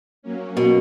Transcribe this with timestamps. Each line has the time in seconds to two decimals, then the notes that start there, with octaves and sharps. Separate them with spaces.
0.23 F#3 A#3 C#4
0.57 B2